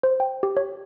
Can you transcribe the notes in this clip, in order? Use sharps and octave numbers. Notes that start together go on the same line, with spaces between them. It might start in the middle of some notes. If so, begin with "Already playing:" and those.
C5
G5
G4
C#5